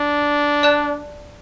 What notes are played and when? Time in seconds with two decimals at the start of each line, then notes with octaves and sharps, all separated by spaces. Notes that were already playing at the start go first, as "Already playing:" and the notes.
Already playing: D4
0.63 D5 A5 F#6